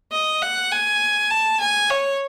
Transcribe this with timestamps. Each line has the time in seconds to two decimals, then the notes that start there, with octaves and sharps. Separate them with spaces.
0.12 D#5
0.41 F#5
0.71 G#5
1.30 A5
1.60 G#5
1.90 C#5